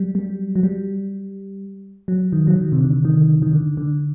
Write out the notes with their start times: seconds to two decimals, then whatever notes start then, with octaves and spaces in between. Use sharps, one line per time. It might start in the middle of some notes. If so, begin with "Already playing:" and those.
Already playing: F#3 G3
0.15 G3
0.56 F#3
0.63 G3
2.08 F#3
2.33 D#3
2.47 F#3
2.56 D#3
2.72 C3
2.80 D3
3.05 D#3
3.42 D#3
3.53 D3
3.77 D3